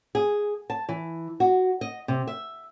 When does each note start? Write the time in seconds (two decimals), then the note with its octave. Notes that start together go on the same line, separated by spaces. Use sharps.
0.15 G#4
0.70 A5
0.89 E3
1.40 F#4
1.81 D#5
2.08 C3
2.27 E5